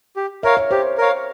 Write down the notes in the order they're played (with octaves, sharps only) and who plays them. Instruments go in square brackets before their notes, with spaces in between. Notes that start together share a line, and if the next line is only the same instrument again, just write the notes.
[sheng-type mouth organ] G4
[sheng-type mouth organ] A#4 C#5 F5 [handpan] E5
[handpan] C#5
[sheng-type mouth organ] G4 [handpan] C5
[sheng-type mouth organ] A#4 C#5 F5